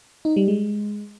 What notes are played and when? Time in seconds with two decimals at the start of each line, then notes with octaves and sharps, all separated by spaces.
0.25 D#4
0.36 G3
0.48 G#3